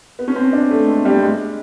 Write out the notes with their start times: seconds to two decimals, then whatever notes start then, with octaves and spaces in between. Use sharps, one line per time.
0.19 B3
0.28 C#4
0.36 C4
0.53 D4
0.71 A3
0.88 G#3
1.05 G3
1.23 G#3